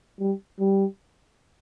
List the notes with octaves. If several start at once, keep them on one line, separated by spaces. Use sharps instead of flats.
G3
G3